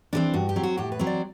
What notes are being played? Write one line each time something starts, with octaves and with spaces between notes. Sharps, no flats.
E3 G3 C4 D4
G2 F#4
G4
F#3 C4
F#4
A2 G4
B4
F#3 C4
D5